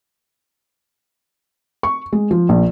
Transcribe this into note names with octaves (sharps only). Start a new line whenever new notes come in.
C#6
G#3
F3
A#1